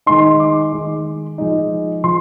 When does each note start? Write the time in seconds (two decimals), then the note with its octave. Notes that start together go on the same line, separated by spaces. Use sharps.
0.06 D#3 G#3 D#4 C6
0.40 D6
0.72 D#3 G#3 D#4
1.38 F3 G#3 D#4
2.04 F3 C6